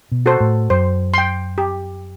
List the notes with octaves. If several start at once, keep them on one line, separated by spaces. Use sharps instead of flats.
B2
F#4 A4 C5
A2
F#2 C5
G5 C6
G4